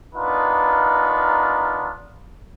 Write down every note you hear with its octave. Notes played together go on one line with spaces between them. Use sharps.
B3 D4 D#4 F4 A#4 B4